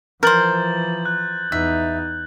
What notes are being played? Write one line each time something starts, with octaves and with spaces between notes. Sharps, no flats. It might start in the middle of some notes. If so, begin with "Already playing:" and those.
E3 F3 A#4 C5 G6 A6 F#7
F#6
E2 D#4 E5